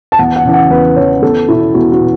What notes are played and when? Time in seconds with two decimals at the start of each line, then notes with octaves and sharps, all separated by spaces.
0.12 A5
0.19 E2 F#5
0.36 F#5
0.45 C#3 E3
0.53 F#5
0.70 E2 B4
0.96 C#3 E3 C#5
1.22 E2 A4
1.48 B2 E4
1.74 E2 F#4
1.92 F#4
2.01 B2